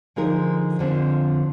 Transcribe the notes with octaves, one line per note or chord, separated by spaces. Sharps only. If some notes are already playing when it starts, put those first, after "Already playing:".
D3 F3 G#3 D#4 A#4
F2 D3 F3 C4